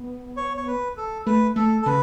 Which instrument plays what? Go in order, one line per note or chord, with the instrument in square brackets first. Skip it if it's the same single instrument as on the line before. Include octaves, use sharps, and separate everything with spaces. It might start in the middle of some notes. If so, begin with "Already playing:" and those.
Already playing: [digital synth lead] B3
[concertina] C#5
C#5
B4
A4
[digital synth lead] A3 [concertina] B4
[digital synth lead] A3 [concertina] A4
[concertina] A4
[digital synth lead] C#3 [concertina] B4